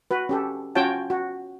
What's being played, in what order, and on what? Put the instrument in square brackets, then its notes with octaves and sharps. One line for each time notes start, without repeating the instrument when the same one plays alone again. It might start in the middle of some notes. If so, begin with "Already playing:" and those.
[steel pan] F#4 B4
C#4 G4 A4
C#4 F4 F#4 C#5 G5 A5
F#4